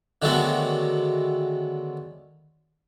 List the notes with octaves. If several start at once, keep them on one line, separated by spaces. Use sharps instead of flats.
D3 D#3 F#3 G#3 A3 B3